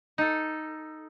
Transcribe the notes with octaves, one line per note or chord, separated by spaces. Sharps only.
D#4 A4